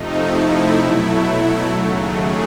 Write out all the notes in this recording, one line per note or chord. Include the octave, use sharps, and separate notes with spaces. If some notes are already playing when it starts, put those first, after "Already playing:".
Already playing: F2 C3 F3 A3 D#4
E4
B2 F#3 A3
D#2 C#3 F#3 A3
G#4